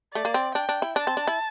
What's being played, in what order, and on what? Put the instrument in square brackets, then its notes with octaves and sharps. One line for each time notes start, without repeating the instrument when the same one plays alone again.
[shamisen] A3 [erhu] D5
[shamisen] A#3
C4
[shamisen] D4 [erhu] G5
[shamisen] D4
E4
[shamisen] D4 [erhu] A5
[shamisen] C4
D4
E4